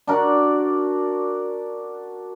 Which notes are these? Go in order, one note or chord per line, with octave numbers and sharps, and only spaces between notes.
D4 F#4 A#4 D5